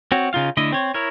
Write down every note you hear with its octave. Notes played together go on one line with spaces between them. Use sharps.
C4 F#4 C#5
C#3 D#4 F4 F5
D3 A3 E4 D#5
C4 C#5
E4 A#4 C#5